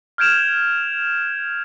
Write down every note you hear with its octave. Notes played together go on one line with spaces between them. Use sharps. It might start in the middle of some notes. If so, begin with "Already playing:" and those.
F6 G6 G#6 D7 E7 F7